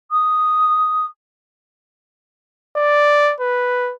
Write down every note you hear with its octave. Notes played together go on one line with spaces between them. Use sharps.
D#6
D5
B4